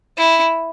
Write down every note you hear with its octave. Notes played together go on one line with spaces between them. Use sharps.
E4